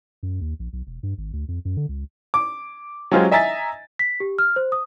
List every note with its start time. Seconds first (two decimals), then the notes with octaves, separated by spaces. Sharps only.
0.23 F#2
0.41 D#2
0.60 A#1
0.73 B1
0.87 E1
1.03 G2
1.18 G#1
1.33 D2
1.48 F2
1.65 F#2
1.77 D3
1.89 C#2
2.34 D6
3.11 F#3 G#3 C#4 F4 G4 C5
3.31 D#5 E5 G#5 A#5 A6 B6
3.99 B6
4.20 G4
4.39 F6
4.56 C5
4.72 D#6